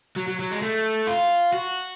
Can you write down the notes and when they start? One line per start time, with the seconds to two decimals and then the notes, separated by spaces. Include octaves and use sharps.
0.16 F#3
0.28 F#3
0.40 F#3
0.51 G#3
0.62 A3
1.07 F4
1.53 F#4